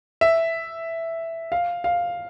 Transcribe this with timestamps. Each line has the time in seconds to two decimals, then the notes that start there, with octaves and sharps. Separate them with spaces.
0.21 E5
1.52 F5
1.84 F5